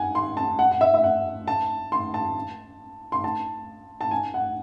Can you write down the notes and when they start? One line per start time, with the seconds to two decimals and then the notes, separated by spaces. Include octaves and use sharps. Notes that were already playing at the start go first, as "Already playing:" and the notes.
Already playing: F#5 G#5
0.15 C6
0.37 A5
0.59 F#5
0.71 F#5
0.81 E5
0.94 E5
1.04 F#5
1.48 A5
1.92 C6
2.14 A5
3.12 C6
3.24 A5
4.01 A5
4.11 G#5
4.34 F#5